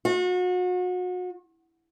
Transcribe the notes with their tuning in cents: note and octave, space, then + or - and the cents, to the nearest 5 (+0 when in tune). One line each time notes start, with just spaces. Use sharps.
F#4 -35